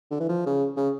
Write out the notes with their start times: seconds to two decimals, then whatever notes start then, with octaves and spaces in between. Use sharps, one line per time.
0.11 D3
0.20 E3
0.29 F3
0.46 C#3
0.77 C#3